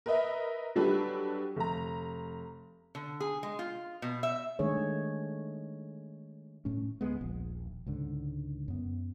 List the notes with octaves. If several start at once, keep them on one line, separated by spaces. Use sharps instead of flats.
A#4 B4 D#5 E5
F#3 G3 D4 G4 A4 B4
F1 A#5
D3
G#4
G#3
F4
B2
E5
D#3 G#3 A3 D4 G#4 C#5
A2 A3 C#4
D2 G#3 B3
D#1 A#1
C#2 G#2 D3
F#2 B3